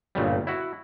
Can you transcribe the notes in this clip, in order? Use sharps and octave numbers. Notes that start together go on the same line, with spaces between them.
G1 A#2 C#3 G3
E4 F#4